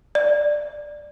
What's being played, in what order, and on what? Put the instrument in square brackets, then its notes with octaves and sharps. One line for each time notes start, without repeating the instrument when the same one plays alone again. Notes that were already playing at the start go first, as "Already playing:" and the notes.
[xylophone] D5